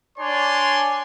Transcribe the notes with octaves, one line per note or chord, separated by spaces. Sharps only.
D4 C#5 D5 G#5 C6